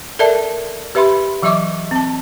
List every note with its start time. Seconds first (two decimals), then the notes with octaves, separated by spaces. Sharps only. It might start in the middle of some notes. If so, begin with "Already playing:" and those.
0.19 A4 A#4 D5 E5 A5
0.95 G4 B4 E5 B5 C6
1.42 E3 F#3 D#5 E5 C#6 D6
1.91 C4 A5